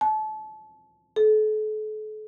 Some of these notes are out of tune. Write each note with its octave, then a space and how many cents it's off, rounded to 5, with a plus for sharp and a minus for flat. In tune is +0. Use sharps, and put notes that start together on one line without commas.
A5 -30
A4 -40